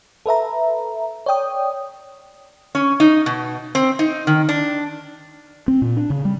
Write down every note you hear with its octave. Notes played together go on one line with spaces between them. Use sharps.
A4 B4 E5 A#5
C#5 D5 G5 D#6
C#4
D#4
B2
C4
D#4
D#3
D4
C4
A#2
D4
C#3
G3